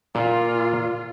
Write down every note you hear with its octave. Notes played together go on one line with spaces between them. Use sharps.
A#2 F4